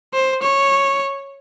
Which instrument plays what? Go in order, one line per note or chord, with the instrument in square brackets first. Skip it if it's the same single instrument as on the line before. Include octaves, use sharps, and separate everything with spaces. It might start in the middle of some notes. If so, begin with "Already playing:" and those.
[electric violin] C5
C#5